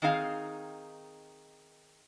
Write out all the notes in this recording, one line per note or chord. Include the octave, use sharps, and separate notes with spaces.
D#3 C4 D#4 G#4 F5